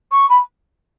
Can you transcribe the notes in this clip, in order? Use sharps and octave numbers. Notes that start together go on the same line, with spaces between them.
C#6
B5